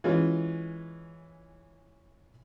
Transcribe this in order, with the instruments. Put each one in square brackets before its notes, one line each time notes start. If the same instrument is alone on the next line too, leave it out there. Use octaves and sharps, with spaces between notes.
[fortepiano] E3 G#3 C#4 F4